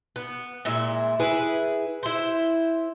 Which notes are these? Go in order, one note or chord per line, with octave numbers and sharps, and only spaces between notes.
B3
A#2 G#3 E4
E4 G#4 B4
E4 C5